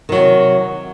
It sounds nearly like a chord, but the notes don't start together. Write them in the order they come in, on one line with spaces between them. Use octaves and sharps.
D#3 F#3 C3